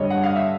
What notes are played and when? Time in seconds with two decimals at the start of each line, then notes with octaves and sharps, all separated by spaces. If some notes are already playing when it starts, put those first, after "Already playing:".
Already playing: G2 D3 G3 C#5 D#5
0.10 F#5
0.24 F5
0.36 E5